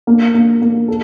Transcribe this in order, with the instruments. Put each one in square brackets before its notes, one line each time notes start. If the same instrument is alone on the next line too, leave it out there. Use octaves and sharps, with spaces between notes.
[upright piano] A#3
A#3
A#3
A4